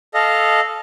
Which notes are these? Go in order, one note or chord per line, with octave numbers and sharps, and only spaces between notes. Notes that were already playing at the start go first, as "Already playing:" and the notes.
A4 D#5 F5